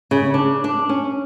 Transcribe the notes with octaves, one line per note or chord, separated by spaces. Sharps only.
C#3
D4
D4
C#4